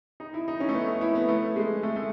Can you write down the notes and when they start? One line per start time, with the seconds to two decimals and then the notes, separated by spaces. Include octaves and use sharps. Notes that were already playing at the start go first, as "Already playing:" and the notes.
0.20 D#4
0.34 E4
0.48 D#4
0.60 C#4
0.69 A3
0.74 B3
0.88 A3
1.01 E4
1.15 B3
1.29 A3
1.56 G#3
1.83 A3
1.96 A3